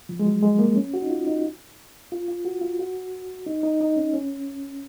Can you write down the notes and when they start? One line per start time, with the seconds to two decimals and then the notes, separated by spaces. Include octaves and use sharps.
0.09 F3
0.19 G#3
0.26 F#3
0.42 G#3
0.59 A#3
0.76 C#4
0.94 F#4
1.02 D#4
1.09 F4
1.27 D#4
2.12 F4
2.28 F4
2.45 F#4
2.61 F4
2.79 F#4
3.46 D#4
3.63 D#4
3.80 D#4
3.96 C#4
4.13 C#4